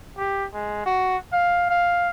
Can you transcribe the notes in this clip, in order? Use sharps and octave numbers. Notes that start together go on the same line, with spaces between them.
G4
G#3
F#4
F5
F5